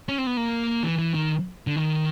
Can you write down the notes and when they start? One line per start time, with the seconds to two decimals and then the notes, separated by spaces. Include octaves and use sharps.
0.09 C#4
0.18 C4
0.27 B3
0.37 A#3
0.84 E3
0.98 E3
1.14 D#3
1.67 D3
1.76 D#3